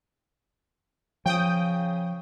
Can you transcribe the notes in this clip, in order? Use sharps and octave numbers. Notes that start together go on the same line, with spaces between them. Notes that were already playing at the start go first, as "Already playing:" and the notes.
C#3 F3 G5 D#6